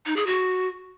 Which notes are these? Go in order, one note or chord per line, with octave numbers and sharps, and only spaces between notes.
D#4
G#4
F#4